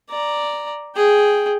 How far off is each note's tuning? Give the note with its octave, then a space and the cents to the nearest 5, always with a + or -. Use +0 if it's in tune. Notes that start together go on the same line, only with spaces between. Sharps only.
D5 +0 A#5 +0
G#4 +0 G5 +0